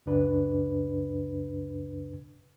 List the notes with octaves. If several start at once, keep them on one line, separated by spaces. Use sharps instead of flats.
C#2 F#2 C#3 D4 B4